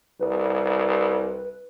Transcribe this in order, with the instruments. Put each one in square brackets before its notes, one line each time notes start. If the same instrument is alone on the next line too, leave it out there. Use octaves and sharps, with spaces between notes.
[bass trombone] C2 [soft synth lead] B4